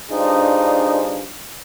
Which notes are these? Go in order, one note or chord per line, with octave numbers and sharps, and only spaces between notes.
G2 D4 D#4 F4 G#4 C5